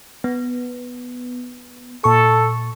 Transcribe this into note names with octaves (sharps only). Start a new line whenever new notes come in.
B3
A#2 A4 C#6